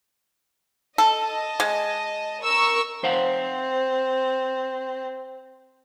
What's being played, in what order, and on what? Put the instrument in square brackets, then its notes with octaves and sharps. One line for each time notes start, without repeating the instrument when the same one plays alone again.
[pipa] A4 [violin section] D#5 A5
[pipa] G#3
[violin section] A#4 C#6 E6
[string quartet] C4 [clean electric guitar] C5 F5 F#5